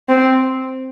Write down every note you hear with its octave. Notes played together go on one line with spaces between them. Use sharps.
C4